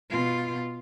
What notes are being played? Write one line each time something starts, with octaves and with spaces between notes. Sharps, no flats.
B2 F4